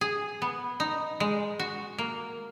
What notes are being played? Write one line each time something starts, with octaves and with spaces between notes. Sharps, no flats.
G#4
B3
D#4
G#3
F#4
A#3